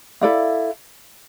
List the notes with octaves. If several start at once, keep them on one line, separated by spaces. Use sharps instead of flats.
E4 A4 D5 F5